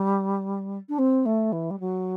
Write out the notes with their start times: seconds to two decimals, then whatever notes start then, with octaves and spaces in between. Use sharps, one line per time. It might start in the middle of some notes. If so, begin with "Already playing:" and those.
Already playing: G3
0.89 D4
0.98 C4
1.25 A3
1.52 E3
1.70 G3
1.79 F#3